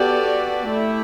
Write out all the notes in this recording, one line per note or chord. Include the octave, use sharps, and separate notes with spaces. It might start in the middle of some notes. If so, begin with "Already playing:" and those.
Already playing: B3 F#4 G4 A4 D5
A3 E4